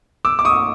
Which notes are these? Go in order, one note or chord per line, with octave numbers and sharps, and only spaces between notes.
D6 E6
D6
C#6 D#6